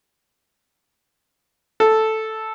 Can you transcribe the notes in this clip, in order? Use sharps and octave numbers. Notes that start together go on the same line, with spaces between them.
A4